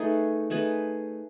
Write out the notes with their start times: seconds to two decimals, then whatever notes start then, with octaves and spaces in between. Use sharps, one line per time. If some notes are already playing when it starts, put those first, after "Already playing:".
Already playing: A3 D#4 G#4 B4
0.50 A3 D#4 G#4 B4